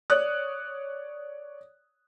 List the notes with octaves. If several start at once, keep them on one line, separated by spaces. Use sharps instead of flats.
C#5 D5 D#6 F#6